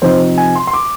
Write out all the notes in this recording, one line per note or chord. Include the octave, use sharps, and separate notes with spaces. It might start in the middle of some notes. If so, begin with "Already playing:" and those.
C3 F3 C4 D#4 C5
G#5
C6
C6
D6